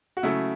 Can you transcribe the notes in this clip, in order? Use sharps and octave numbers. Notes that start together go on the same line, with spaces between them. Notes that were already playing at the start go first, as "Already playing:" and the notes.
F#4
C#3 F#3 A3 E4